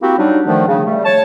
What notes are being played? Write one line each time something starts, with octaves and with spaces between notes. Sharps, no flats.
A#3 C4 E4 F#4 G4
F#3 G3 D4 D#4
D3 D#3 F3 A3 D4
C#3
G3 A3
C#5 A5